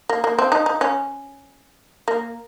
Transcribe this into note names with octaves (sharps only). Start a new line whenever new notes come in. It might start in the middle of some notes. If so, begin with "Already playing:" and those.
A#3
A#3
C4
D#4
D#4
C#4
A#3